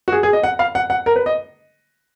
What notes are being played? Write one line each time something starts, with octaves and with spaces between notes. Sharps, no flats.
F#4
G#4
G#4
D#5
F#5
F5
F#5
F#5
A#4
B4
D#5